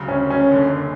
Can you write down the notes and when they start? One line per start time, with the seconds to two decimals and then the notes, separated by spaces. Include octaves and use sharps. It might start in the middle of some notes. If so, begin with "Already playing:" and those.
Already playing: D2 C#3 F#3
0.08 C#4
0.30 C#4
0.52 F#1 F#2 D3